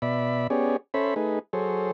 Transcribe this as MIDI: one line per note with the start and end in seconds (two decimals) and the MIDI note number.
0.02 0.47 47
0.02 0.47 74
0.02 0.47 76
0.02 0.47 83
0.50 0.77 59
0.50 0.77 61
0.50 0.77 67
0.50 0.77 68
0.50 0.77 73
0.50 0.77 74
0.94 1.14 61
0.94 1.14 69
0.94 1.14 72
0.94 1.14 73
0.94 1.14 76
0.94 1.14 83
1.16 1.39 57
1.16 1.39 63
1.16 1.39 68
1.16 1.39 71
1.53 1.91 54
1.53 1.91 68
1.53 1.91 69
1.53 1.91 72
1.53 1.91 73